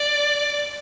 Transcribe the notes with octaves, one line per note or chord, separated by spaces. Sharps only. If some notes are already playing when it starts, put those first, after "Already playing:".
Already playing: D5